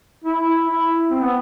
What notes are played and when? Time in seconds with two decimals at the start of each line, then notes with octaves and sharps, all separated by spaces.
0.24 E4
0.67 E4
1.10 C4
1.22 B3